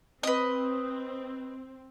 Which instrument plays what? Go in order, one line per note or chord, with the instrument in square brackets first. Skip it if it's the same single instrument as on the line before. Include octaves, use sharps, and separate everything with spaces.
[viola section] C4 [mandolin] B4 D#5